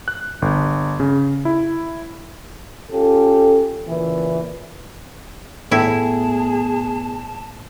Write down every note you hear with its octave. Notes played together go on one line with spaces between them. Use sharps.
F#6
G1
C#3
E4
C#4 F4 G4 A4
A#2 C#3 E3
A2 B3 E4 G#4 A5